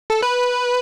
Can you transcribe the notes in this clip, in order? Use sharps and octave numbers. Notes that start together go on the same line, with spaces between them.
A4
B4